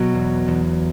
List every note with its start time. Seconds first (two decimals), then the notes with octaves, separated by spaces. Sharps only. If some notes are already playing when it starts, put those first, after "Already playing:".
Already playing: B2 F#3
0.15 E2
0.48 E2